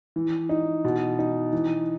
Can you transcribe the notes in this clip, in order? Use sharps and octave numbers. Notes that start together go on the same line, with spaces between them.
E3
D#4
B2
D#4
E3